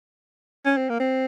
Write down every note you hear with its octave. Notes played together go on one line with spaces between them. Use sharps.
C#4
C4
A#3
C4